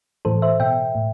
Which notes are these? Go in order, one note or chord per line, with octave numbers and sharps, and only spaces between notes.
A2 E3 A4 C5
C5 E5
B2 E5 G5
A2